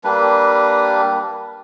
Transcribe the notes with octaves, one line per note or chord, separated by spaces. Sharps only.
G3 A#3 D4 B4